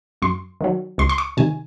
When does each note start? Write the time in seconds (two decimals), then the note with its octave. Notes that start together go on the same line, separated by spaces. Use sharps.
0.22 F#2 C6
0.61 D#3 F#3
0.98 C#2 C6
1.09 C6
1.18 C#6
1.37 C3 D#3 G#5